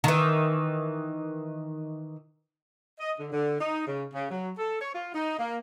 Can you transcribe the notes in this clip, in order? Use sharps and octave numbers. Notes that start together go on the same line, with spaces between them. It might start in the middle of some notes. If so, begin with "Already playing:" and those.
D#3 E3
D#5
D3
D3
D#4
C#3
C#3
F#3
A4
C#5
F4
D#4
A#3